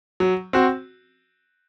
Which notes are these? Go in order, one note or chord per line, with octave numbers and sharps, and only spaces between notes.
F#3
C4 F#4